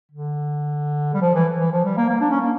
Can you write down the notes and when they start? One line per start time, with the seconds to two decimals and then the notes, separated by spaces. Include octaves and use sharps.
0.12 D3
1.14 G3
1.22 F3
1.35 E3
1.60 E3
1.72 F3
1.84 G3
1.97 A#3
2.09 A#3
2.21 D4
2.31 C#4
2.41 A#3